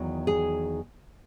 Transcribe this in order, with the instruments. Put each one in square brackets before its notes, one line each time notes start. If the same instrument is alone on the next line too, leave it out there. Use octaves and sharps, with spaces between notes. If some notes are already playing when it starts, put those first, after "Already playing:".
Already playing: [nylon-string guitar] E2 D#3 F#3
G#4